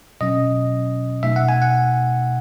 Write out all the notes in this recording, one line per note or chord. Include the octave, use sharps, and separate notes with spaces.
B2 F#3 C#4 D#5
B2 A3 D#4 E5
F#5
G#5
F#5